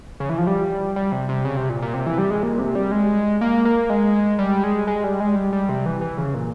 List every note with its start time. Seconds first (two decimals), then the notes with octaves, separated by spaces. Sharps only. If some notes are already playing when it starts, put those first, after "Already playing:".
0.20 C#3
0.29 E3
0.38 F3
0.47 G3
0.96 G3
1.12 C3
1.29 C3
1.45 C#3
1.57 C3
1.70 A#2
1.82 A#2
1.94 C3
2.06 E3
2.18 G3
2.30 G#3
2.43 A#2
2.59 C3
2.75 G3
2.92 G#3
3.41 A#3
3.65 A#3
3.90 G#3
4.39 G3
4.64 G#3
4.87 G#3
5.04 G3
5.20 G#3
5.36 G3
5.53 G3
5.69 C3
5.86 E3
6.01 E3
6.18 C#3
6.34 A#2